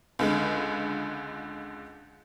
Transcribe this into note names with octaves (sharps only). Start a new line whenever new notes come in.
C#2 D3 G#3